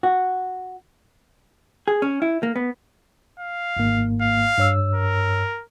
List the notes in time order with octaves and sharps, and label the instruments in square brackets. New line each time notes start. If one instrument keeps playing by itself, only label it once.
[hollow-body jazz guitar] F#4
G#4
C#4
E4
A#3
B3
[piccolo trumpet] F5
[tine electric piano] G#1 G#2 A#3
[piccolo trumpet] F5
[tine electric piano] G2 C#5 E6
[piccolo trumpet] A#4